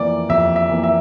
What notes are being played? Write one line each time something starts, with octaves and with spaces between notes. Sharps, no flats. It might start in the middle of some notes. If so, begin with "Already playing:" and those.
Already playing: F2 E3 A#3 D5
F2 E5
E5
E3 A#3
E5